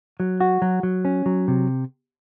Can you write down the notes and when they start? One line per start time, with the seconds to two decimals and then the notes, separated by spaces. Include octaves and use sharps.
0.20 F#3
0.40 F#4
0.62 F#3
0.83 F#3
1.05 C#4
1.26 F#3
1.48 C3